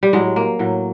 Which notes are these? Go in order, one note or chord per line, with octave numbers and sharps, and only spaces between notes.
G3
A2 F#3 G#3
A#3
A2 F#3